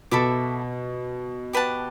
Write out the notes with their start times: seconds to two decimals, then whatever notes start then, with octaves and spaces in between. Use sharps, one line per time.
0.11 B2 A4 E5 B5 D6
1.53 G4 B4 F#5 A5